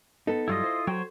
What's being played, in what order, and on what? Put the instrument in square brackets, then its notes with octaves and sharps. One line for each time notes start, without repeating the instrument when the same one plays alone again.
[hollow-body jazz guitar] B3 D#4 [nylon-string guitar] A4
[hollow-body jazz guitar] G2 F#3 G3 [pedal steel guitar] E4 F4 D#5
[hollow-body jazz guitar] C5
[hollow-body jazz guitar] F#3 F#4 G5 [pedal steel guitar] C5 C#5